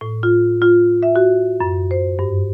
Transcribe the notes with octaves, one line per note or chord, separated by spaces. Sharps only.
A2
F4
F4
E5
F#4
F#2
C5
G2